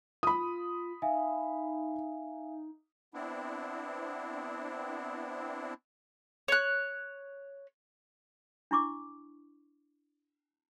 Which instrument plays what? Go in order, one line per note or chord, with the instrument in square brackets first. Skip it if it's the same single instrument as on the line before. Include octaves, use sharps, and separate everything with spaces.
[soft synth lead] F4 [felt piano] B5 D#6
[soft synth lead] D#4 [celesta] E5 F5 G#5
[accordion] B3 C4 D4 E4
[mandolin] C#5 F#6
[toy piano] D4 E4 C#6 D6